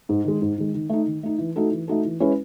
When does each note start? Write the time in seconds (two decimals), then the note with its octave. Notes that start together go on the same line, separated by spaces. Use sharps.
0.09 G#2
0.24 D#3 G#3
0.42 G#2
0.58 D#3 G#3
0.74 D#3
0.89 A3 D#4
1.06 D#3
1.23 A3 D#4
1.38 E3
1.56 A3 D#4 F#4 A4
1.71 E3
1.88 A3 D#4 F#4 A4
2.05 E3
2.20 G#3 C#4 E4 B4